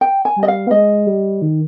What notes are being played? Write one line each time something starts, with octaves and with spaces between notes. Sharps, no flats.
G5
G#5
G3
D#5
F5
B3
G#3 D#5
G3
D#3